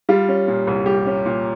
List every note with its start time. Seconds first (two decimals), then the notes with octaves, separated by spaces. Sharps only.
0.09 G3 F4
0.29 C#4
0.48 A#2
0.67 C2
0.86 G3 G4
1.06 C#4
1.26 A#2